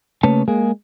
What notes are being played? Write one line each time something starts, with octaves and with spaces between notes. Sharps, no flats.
C#3 A3 A#3 B4 C#5 A5
G#3 A#3 G#4